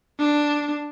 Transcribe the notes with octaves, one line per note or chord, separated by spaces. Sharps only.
D4